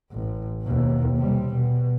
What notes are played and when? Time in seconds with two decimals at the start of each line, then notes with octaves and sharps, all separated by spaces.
0.12 A1
0.62 D#2 B2
1.17 C3 G3
1.54 B2